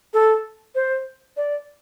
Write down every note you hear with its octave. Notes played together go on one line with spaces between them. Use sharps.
A4
C5
D5